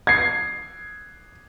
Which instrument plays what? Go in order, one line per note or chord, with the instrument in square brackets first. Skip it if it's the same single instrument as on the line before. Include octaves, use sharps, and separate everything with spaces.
[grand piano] G#6 C7